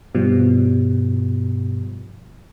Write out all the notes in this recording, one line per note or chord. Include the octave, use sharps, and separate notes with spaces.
G2 B2 F3 G3